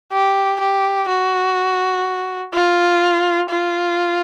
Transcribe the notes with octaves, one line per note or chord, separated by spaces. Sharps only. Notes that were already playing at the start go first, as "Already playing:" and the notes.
G4
G4
F#4
F4
F4